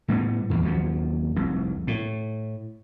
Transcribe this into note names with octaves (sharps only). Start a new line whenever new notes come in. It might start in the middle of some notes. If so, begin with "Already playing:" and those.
A2 G3 G#3 B3
E2 G#2
D#2 F3 F#3
F1 C2
A2